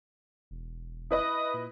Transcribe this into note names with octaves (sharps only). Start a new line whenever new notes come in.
E1
E4 B4 D#5 D#6
A#2